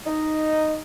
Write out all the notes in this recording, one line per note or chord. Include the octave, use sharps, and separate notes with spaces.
D#4